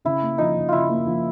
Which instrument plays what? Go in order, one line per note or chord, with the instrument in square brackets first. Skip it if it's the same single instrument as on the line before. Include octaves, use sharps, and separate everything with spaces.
[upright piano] C#3 [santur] E4
[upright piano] A#3
[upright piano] F3 [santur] D#4
[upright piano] C#3
[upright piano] C#3 [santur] E4 F4
[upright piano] A#3
F3